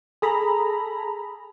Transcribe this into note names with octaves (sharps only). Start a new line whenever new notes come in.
G#4 A4 A#5 B5